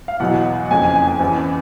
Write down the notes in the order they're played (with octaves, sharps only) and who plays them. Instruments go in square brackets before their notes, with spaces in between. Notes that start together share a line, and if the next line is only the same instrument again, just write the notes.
[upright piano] F5
E2 B2 F#3 F#5
F#1 F2 C#3 G#5
G#5
G#5
G#5
E2 C#3 E3